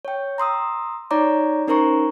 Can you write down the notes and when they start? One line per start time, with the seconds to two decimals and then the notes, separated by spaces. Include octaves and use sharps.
0.05 C#5 G5
0.38 A#5 C6 D#6 E6
1.11 D#4 C#5 D5 A#5 D6
1.68 C#4 D#4 A#4 C5 A#5 C#6